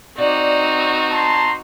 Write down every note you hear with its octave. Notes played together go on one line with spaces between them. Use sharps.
C4 D#4 F#4 D5
A5 A#5 C6